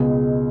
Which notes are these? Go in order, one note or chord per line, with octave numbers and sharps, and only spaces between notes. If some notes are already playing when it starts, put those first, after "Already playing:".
Already playing: C#2 B2 G#3